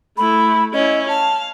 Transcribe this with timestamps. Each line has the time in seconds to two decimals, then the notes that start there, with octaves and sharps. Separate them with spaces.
0.17 A3 E4 B5
0.73 C#4 E4 D#5
1.09 F5 A5